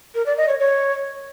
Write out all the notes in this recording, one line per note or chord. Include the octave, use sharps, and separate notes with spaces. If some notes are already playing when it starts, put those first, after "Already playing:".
A#4
D5
D#5
C#5
C#5